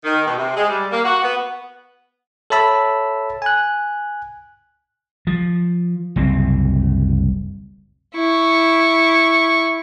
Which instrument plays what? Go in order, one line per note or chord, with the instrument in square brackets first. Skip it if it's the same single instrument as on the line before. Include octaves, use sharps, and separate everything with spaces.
[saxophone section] D#3
B2
C3
G#3
G3
A#3
F#4
B3
[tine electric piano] A4 C#5 E5 A5 B5 E6
G#5 F#6
[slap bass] F3
F#1 C2 C4
[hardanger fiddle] E4 C#6